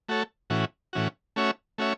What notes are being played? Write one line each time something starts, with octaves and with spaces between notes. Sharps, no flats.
A3 F#4 A4 C#5
A2 E3 C#4 F#4
A2 E3 C#4 F#4
A3 C#4 F#4 C#5 E5
A3 C#4 F#4 C#5 E5